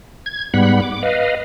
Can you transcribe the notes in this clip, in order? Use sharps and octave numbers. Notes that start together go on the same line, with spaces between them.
G#6
G#2 G3 B3 F#5 B5
D6
B4 D#5 F5